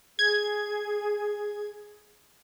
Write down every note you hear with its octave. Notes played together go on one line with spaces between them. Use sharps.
G#4 G#6